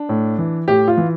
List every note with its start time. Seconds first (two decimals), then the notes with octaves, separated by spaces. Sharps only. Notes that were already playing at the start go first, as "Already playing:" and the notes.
Already playing: D4
0.09 A2
0.39 E3
0.68 A2 G4
0.88 F4
0.97 E3